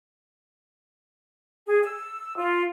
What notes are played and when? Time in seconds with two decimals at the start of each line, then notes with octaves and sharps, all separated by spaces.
1.67 G#4
1.84 E6
2.37 F4